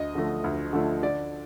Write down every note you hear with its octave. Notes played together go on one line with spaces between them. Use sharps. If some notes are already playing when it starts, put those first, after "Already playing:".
Already playing: D2 D#5
D3 F3 A3
D2
D3 F3 A3
D3 D5